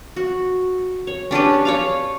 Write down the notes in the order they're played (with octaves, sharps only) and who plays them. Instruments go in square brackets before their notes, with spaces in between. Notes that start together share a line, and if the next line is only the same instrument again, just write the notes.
[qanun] F#4
C#5
C#4 D4 G4 B4
C#5 D5 F5